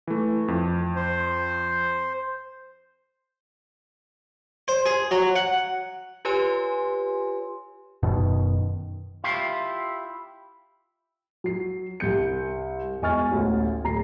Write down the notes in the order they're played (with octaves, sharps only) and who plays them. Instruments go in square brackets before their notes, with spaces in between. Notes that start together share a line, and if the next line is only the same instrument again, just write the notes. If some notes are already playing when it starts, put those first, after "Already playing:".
[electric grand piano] E3 A3
F2
[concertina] C5
[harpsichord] C5
G#4
F#3
F#5
[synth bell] F4 G4 B4 C#5 G#5 C6
[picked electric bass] F#1 F#2 B2 D#3
[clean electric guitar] E4 F4 G4 F5
[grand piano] F#3 C7
C2 G2 G6 C#7
E1 D#5 G#5 C#6 F6 A6
A1 D2
D1 A#5 C7